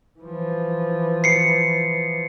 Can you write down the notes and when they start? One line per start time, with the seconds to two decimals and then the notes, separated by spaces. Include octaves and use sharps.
0.19 E3 F3
1.24 C7 C#7